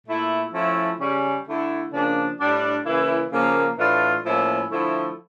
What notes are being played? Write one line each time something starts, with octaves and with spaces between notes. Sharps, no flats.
A#2 A3 E4
F3 A3 C#4 E4
C#3 G3 C#4
D3 A3 E4
C#3 F3 A#3 D4
A2 G3 D4
C#3 E3 A#3 E4
C#3 F3 A#3
A2 E3 A3 D4 F4
A2 F3 A#3 C#4 E4
D3 F3 A3 E4